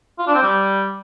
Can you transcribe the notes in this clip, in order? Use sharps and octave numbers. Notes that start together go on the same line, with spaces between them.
F4
D4
C4
G3